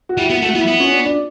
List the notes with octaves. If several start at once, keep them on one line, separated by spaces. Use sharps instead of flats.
F#4
G3 E4
B3 F#4
A3 F#4
B3 E4
B3
C#4
D4
D4